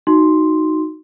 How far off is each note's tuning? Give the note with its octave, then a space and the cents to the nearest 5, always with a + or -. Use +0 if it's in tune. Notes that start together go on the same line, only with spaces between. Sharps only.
D#4 +0 F#4 +0 C6 +0